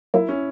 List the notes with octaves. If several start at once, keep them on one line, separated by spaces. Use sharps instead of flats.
F#3 A#3 E4
C#4